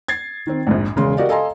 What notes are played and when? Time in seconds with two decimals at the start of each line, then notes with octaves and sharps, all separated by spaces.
0.08 G#6 A6 C7
0.47 D#3 C4
0.67 A#1 F2 G#2
0.96 E1 C#3 G#3 C6
1.17 F#4 G4 A#4 D5 D#5 F5
1.29 A4 D#5 F5 G#5 A#5 C6